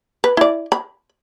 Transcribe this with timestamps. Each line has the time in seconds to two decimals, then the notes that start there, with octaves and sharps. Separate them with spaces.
0.24 B4
0.37 E4 D5
0.72 B5